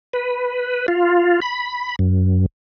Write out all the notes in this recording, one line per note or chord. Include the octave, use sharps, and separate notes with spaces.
B4
F4
B5
F#2